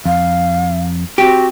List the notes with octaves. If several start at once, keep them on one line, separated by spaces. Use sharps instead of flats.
F2 F5
C4 F#4 G4